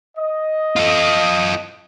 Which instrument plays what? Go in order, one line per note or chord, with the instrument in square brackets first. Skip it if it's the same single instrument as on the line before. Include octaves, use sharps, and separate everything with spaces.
[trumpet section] D#5
[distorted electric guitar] F4 A4